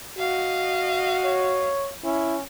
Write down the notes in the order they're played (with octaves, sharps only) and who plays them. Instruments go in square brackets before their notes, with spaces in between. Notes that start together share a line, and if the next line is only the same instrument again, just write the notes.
[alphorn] F#4 [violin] D#5 F5
[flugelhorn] C#5
[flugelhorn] C#4 [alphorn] E4